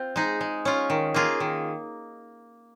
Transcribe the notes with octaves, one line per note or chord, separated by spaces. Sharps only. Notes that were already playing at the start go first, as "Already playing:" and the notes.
Already playing: C4 F4
G#3 D#4 G#4
G#3
C#4 F4
D#3
A#3 F4 G#4
D#3